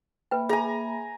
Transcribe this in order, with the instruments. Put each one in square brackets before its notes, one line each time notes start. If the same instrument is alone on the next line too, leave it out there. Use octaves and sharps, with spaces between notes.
[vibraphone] A#3 E5 B5 [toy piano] B4 G5
[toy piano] G#4 [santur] G#5 A#5